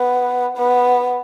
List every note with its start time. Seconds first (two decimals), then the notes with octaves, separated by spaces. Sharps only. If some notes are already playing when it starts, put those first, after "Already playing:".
Already playing: B3
0.58 B3